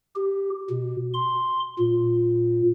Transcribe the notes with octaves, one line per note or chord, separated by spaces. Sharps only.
G4
B2
C6
A#2